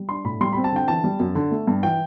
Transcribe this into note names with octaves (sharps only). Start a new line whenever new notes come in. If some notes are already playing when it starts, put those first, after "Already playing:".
Already playing: G3
D4 C6
A2 B5
G3 C6
C4 B5
A5
D3 G5
E3 A5
G3
F#2
D3
A3
G2
E3 G5